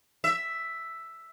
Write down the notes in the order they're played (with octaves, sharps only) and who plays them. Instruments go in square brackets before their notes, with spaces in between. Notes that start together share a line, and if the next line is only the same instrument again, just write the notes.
[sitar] E5